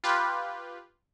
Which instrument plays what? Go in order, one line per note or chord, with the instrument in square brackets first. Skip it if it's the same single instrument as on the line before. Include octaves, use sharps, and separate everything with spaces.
[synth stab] F4 G4 B4